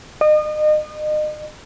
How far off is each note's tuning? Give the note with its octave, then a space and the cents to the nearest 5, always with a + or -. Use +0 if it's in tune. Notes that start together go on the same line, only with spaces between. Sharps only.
D#5 -35